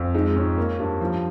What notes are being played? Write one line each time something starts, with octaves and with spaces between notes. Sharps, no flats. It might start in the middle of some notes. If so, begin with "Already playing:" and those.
Already playing: F2
G#3 D#4
G#2 C#4
A#3
G2
F3